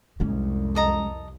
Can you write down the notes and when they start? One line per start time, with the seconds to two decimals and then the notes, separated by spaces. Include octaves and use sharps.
0.20 C2 F2 G#3 C#4
0.75 A4 D#5 A#5